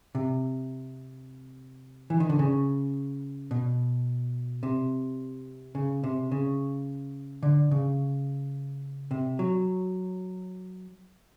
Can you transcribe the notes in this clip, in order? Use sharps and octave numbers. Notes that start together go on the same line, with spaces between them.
C3
E3
D#3
D3
C#3
B2
C3
C#3
C3
C#3
D3
C#3
C3
F#3